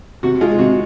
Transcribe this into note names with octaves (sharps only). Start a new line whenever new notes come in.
C3 F#4
G#3 F4
C3 F#4